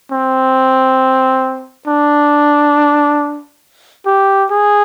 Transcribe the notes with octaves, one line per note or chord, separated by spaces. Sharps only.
C4
D4
G4
G#4